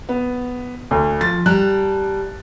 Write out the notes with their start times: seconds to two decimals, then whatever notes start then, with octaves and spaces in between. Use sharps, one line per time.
0.09 B3
0.91 D2
1.21 F3 A6
1.46 G3 A5 A#5 F#6